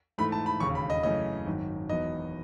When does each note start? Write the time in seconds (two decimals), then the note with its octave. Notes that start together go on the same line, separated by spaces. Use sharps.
0.18 G#2 E3 A3 B5
0.32 A5
0.46 B5
0.60 E1 D#2 C#3 C#6
0.75 B5
0.90 D#5
1.03 F#2 C#3 E3 A3 C#4 D#5
1.46 G#1 F#2 D#3
1.89 E1 E2 D#3 F#3 B3 D#5